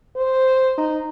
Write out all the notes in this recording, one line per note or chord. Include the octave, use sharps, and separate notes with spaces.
C5
D#4